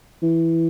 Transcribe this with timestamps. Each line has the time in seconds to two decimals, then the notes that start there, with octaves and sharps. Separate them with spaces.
0.23 E3